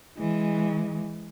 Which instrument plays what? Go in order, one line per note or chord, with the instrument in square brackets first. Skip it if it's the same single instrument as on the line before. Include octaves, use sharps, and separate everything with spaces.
[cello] E3 G#3